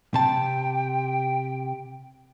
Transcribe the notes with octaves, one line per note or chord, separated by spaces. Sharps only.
C3 G5 A5